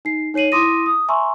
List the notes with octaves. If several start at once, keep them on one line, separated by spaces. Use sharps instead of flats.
D#4 C7
D#4 C#5 C7 D#7 F#7
E4 C6 D6 D#6 A#6 D#7
D#6
E5 G#5 A#5 C6 C#6 E6